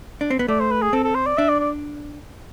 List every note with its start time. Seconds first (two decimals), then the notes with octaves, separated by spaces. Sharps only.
0.21 D4
0.30 C4
0.39 B3
0.48 A3 D5
0.60 C5
0.71 B4
0.82 G#4
0.93 C4 A4
1.04 A4
1.15 C5
1.26 D5
1.38 D4 E5
1.49 D5
1.60 D5